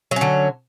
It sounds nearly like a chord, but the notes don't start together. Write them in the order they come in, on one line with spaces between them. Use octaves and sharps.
F#3 C#4 D3